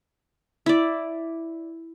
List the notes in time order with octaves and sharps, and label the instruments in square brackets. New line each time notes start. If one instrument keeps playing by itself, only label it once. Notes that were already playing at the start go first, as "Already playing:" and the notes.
[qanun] E4 D5